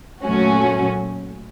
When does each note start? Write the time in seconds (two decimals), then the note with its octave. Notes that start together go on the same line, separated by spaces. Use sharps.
0.24 A#2 F#3 A3 C#4 F#4